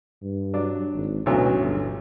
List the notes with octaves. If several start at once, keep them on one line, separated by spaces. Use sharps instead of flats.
G2
F#3 D4
G#1
A1 D2 B2 F#3
G1